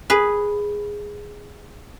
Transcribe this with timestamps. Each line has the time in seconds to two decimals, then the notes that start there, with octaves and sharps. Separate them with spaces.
0.10 G#4 B4